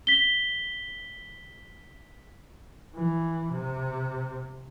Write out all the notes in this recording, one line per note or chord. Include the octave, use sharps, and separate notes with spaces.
B6 G7
E3
C3